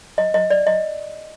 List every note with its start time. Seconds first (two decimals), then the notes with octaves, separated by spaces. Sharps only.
0.18 D#5
0.34 D#5
0.50 D5
0.67 D#5